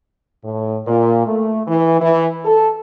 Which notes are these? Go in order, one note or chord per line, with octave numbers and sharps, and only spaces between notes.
A2
A#2
A3
E3
E3
A4